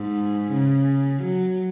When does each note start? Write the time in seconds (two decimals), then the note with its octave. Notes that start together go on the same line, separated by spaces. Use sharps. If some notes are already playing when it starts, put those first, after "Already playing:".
Already playing: G#2
0.53 C#3
1.23 F#3